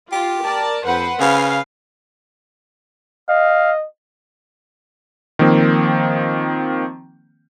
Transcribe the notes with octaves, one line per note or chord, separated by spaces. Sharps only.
F4 G4
A#4 D5 A5
F2 B4 C5 F#5
C#3 B4 F5
D#5 F5
D#3 F3 A#3 C4